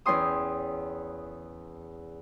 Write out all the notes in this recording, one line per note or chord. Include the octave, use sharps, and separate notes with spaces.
E2 C#4 G5 C6 D#6